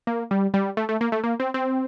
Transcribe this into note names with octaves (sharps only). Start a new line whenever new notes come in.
A#3
G3
G3
A3
A3
A#3
A3
A#3
C4
C4